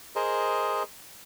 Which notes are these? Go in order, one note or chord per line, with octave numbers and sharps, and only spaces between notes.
G#4 A#4 C5 D#5